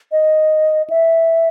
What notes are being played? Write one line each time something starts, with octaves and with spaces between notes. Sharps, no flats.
D#5
E5